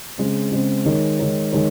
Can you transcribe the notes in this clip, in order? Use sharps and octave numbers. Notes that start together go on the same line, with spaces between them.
C#3 G#3 C4
C#3 G#3 C4
D#3 G#3 D#4 A#4 C#5
D#3 G#3 D#4 A#4 C#5
D#3 G#3 D#4 A#4 C#5